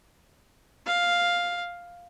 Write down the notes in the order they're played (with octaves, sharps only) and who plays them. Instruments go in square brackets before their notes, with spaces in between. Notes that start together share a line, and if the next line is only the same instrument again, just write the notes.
[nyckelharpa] F5